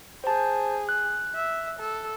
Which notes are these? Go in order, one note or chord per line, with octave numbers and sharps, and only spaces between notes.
G#4 C5 A5
F#6
E5
A4